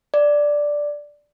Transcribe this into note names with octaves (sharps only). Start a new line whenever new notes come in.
D5